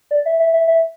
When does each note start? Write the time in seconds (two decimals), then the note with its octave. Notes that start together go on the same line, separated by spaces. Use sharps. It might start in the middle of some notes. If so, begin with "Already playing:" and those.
0.11 D5
0.26 E5
0.40 E5
0.53 E5
0.68 E5